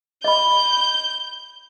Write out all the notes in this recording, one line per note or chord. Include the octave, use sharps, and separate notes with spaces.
D#5 B5 G6